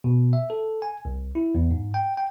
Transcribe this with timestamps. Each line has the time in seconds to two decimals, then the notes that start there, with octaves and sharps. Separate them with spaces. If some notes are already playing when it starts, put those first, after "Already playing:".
0.04 B2
0.33 E5
0.50 A4
0.82 G#5
1.05 C2
1.35 E4
1.55 E2
1.71 G#2
1.94 G5
2.17 G5